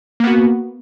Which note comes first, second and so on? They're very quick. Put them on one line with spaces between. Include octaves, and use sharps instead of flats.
A#3 B3 F#4